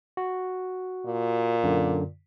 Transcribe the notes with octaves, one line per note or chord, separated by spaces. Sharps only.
F#4
A#2
F#2 D3